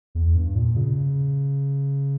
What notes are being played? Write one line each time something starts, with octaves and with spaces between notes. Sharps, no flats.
E2
G2
A#2
C#3